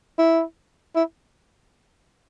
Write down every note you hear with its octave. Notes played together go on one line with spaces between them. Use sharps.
E4
E4